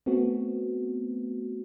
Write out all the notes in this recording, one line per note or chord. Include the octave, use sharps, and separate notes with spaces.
A3 B3 C4 F#4